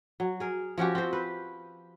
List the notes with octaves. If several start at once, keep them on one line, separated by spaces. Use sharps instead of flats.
F#3
G#4 A#4
F3 C#4 F#4 G4
C4 C5
B4